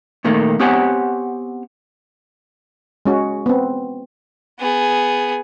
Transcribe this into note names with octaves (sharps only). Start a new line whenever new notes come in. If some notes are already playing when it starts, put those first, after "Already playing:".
A#2 D#3 A3 A#3
B3 C4 G4 C#5 F#5 G#5
G#3 C#4 F#4
B3 C4
B3 G#4